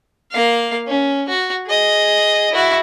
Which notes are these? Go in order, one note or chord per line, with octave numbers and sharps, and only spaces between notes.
A#3 F5
C#4
F#4
G#4 D#5
E4 F#4